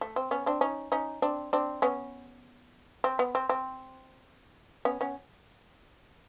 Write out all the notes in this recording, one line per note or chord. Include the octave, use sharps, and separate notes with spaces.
A3
C4
B3 C#4
C4 D4
C#4 D#4
C#4 D#4
C4 D4
C4 D4
B3 C#4
C4
B3
C4
C4
B3 C#4
B3 C#4